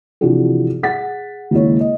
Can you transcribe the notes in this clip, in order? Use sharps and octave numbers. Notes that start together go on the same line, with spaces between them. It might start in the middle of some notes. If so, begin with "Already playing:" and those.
C3 E3 F3 D4 F#4 G#4
G#4 F#5 A6 B6
D#2 C#3 G#3 A#3 E4 C#5
D#5